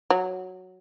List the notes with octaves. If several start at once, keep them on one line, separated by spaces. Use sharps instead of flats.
F#3